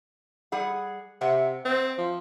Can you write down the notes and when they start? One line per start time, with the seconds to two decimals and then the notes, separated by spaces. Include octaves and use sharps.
0.52 G3 G#4 F#5
1.21 C3 E5 F#5
1.65 C4
1.98 F3